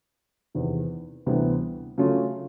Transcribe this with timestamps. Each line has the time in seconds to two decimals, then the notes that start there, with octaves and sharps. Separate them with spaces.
0.55 E2 C3 D#3
1.26 D2 C3 E3 G3 B3
1.98 C#3 F#3 A3 C#4 F4